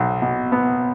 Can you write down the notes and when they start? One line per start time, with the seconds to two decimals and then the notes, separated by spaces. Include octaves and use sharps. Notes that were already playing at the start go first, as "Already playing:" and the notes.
Already playing: B1
0.22 B2
0.52 B3